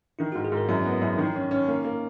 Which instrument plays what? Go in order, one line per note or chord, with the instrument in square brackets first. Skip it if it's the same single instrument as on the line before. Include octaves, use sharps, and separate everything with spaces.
[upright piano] D#3 [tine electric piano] E4
[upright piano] G#2 [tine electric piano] F#4
[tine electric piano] G#4
[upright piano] G#2
[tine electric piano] A#4
[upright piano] F#2 [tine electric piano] E4
[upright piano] B3
[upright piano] F#2 [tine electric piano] E4
[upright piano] D#3 [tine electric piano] D#4
[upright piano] C#4
C#4
A#3
A#3